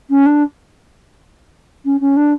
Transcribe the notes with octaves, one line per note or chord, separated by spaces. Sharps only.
C#4
D4
C#4
C#4
D4